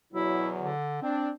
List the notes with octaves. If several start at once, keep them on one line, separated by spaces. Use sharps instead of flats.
E2 B2 F#3 E4
D3
C4 D4